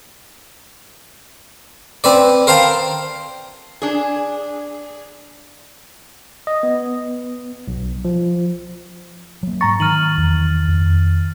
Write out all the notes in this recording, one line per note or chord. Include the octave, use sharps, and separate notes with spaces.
C4 B4 D5
A#4 C5 F5 G5 A5
D4 G#4
D#5
B3
B1
F3
F#3 A#3
G#2 A#5 C#6 A6
D#3 F6 D#7 F#7
E2
F2